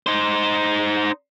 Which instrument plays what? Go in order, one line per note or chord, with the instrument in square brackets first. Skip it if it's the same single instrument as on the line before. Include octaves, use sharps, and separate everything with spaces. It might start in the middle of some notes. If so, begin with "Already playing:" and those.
[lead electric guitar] D#4 C5